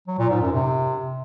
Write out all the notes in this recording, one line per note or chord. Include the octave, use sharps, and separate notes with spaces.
F#3
A#2
G#2
F#2
C3